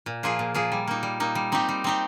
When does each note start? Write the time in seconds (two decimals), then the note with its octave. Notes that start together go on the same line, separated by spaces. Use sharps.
0.06 A#2
0.23 F3 A#3 F4 G#4
0.39 A#2
0.54 F3 A#3 F4 G#4
0.72 G3
0.87 A#3 D#4
1.03 G3
1.20 A#3 D#4
1.35 G3
1.52 C4 D#4 G4
1.69 G3
1.84 C4 D#4 G4